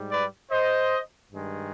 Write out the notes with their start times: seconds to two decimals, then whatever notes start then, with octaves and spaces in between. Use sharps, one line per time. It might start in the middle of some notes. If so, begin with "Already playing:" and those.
Already playing: G#2 G3
0.11 B4 D5
0.51 C5 D#5
1.32 G2 D#3 G#3